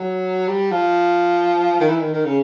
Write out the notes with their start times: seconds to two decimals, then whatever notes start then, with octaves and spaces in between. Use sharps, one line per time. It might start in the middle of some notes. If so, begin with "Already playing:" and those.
Already playing: F#3
0.48 G3
0.72 F3
1.81 D#3
1.89 E3
2.00 D#3
2.13 D#3
2.25 C#3